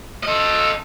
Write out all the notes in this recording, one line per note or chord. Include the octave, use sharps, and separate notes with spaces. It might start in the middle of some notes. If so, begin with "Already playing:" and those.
A4 D#5